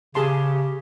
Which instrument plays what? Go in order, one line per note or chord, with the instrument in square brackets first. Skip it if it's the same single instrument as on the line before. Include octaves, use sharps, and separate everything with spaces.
[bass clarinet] C#3 [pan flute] G4 [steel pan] G#4 A5 C6